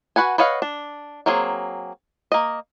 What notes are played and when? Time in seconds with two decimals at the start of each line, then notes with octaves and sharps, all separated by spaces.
0.16 F#4 B4 F#5 G#5
0.38 B4 C#5 D#5 F5 F#5
0.62 D4
1.26 F#3 A#3 C4 G#4
2.32 A#3 D#5